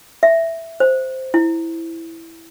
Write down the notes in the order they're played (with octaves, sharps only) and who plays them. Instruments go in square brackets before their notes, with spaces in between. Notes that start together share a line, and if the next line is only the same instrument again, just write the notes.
[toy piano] E5
C5
E4